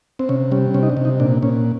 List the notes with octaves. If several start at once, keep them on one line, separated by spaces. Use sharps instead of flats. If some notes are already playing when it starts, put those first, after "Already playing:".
C4
C3 C#4
G3 C#4
C3 C#4
D#4
D4
C3
D#4
A#2 D4
A#2 C#4